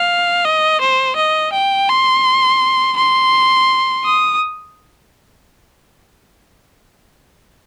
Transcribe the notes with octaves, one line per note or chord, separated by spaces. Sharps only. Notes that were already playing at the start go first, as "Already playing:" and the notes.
Already playing: F5
D#5
C5
D#5
G5
C6
C6
D#6